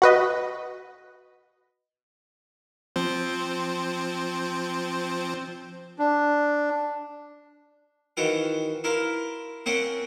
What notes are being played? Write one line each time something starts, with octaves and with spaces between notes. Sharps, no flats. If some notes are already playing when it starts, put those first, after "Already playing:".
F#4 B4 D#5
F3 C4 C5
D4
D#3 E3 F#4 C5 F5 G5
E4 A#4 C5 F5
A#3 C4 C#4 C5 F#5 G5